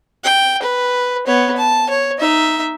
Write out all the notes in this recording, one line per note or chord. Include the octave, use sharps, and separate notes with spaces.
G5
B4
B3 C#5
A5
C#5
D#4 E5